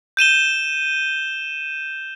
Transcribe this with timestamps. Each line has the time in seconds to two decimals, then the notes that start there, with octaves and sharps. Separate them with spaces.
0.17 G6 D#7 E7 G7